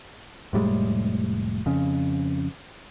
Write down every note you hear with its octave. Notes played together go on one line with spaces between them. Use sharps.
F1 A2 G3 G#3
F2 C#3